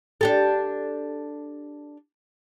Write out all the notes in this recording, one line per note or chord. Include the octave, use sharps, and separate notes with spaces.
D4 G4 A4